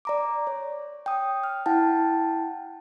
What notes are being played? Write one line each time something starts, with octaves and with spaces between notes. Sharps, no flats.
D5 A#5 D6
C#5
G5 D#6
F6
E4 F#5 G5 A5